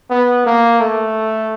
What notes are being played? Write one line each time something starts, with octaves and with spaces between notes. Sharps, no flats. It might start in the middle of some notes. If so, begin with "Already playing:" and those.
B3
A#3
A3